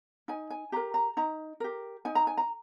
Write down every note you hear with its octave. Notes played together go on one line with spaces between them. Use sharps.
D#4 G#5
G#5
G4 A#4 A#5
A#5
D#4 A#5
G4 A#4
D#4 G#5
A#5
G#5
A#5